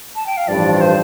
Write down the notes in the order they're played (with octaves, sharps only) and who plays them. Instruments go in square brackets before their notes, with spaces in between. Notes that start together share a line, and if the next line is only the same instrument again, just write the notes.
[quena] A5
G5
F5
[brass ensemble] A1 G2 F3 [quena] D5
[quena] C5